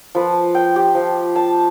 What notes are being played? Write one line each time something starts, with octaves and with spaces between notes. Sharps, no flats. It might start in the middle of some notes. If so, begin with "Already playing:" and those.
F3 B4
G5
G4
F3
A5